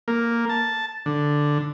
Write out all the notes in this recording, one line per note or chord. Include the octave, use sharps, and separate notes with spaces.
A#3
A5
D3